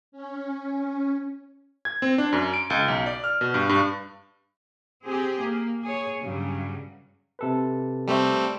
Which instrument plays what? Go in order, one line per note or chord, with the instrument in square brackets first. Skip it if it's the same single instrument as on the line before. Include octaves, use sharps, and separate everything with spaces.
[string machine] C#4
[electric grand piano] G#6
C4
D4
F#2
D7
C#2
B1
D5
F6
B2
G2
G2
[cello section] C4 G4 G#4
A#3
G#4 C#5
G2 C#3 F#3 G3
[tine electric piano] C3 A4 B4
[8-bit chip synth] G3 A3 C4